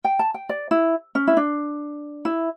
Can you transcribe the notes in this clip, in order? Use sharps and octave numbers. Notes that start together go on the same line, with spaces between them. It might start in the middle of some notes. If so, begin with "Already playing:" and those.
G5
A5
G5
D5
E4
C#4
E4
D4
E4